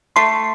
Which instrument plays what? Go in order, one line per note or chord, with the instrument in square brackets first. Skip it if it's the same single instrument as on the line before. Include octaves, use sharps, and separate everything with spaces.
[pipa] A3 [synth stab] C6